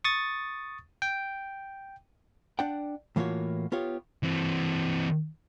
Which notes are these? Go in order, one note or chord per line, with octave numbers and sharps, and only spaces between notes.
C#6 D#6 A6
G5
D4 D5 F#5 G5
A2 E3 A#3 F4 F#4 C#5
B3 F4 G4 C#5
E3 C4